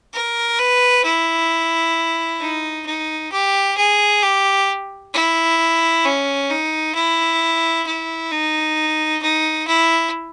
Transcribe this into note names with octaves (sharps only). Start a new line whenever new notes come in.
A#4
B4
E4
D#4
D#4
G4
G#4
G4
E4
C#4
D#4
E4
E4
D#4
D#4
E4